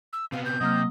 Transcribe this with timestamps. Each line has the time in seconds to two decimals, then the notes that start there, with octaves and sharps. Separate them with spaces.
0.13 E6
0.32 C3 B3 F5
0.45 G6
0.61 C3 F#3 A#3 D#5 F6